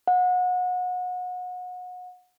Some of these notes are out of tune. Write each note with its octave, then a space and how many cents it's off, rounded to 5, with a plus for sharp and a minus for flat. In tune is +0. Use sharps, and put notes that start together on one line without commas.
F#5 -30